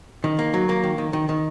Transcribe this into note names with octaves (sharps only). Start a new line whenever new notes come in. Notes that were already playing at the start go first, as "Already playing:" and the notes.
D#3
A#3
F#3
A#3
D#3
D#3
D#3
D#3